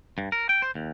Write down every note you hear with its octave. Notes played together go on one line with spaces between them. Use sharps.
G2
A#4
G5
C5
D#2